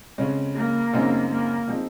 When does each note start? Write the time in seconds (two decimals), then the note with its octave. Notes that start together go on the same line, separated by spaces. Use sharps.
0.18 F2 C#3 G#3 C#4
0.55 A#3
0.93 F#2 C#3 G#3 C4 D#4
1.30 A#3
1.68 F3 G#3 C4 D#4